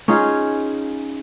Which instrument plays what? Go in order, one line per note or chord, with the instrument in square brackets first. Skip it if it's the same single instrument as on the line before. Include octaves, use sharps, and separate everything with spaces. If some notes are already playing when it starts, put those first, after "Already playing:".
[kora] C#4 D#4 F4 G#4